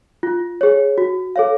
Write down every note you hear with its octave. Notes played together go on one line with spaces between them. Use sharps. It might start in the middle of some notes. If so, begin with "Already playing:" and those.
F4
G#4 C#5
F#4
A4 C#5 F5